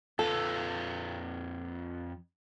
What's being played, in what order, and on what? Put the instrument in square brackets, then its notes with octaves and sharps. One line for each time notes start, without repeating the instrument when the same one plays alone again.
[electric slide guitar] F2 F4 B4 [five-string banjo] A4